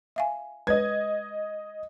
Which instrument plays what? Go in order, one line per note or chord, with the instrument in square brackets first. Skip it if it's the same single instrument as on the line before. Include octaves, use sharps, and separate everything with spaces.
[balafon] E5 F5 G#5
[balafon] G#3 B4 C#5 [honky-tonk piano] D#5 G#6